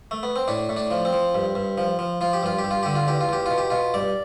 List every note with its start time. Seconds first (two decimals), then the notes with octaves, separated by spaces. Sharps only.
0.11 A3
0.23 B3
0.36 C4
0.48 A2 D4
0.69 A2
0.77 D4
0.91 F3
1.05 C4
1.13 F3
1.34 G2
1.55 G2
1.78 F3
1.99 F3
2.21 F3 F4
2.33 G4
2.43 G2 F4
2.59 G4
2.64 G2
2.71 F4
2.83 D3 G4
2.95 F4
3.07 E2 G4
3.21 F4
3.29 E2 G4
3.46 B2 F4
3.58 G4
3.70 B2 F4
3.94 G2 D5